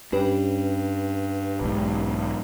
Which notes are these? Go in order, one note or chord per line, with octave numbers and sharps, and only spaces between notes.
G2 C#4 G4 B4
B1 G#2